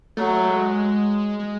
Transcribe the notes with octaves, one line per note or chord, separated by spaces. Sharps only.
F#3 A3
G#3
G#3